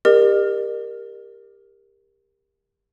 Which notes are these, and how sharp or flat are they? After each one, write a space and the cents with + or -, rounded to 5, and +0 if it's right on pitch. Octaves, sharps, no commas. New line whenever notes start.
G4 +25 A#4 +0 D#5 -45